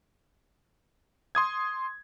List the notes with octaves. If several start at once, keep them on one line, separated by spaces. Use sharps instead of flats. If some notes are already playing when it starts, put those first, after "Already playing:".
C6 D#6 G#6